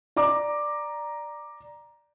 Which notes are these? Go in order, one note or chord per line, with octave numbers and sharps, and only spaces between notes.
D5 A#5 D6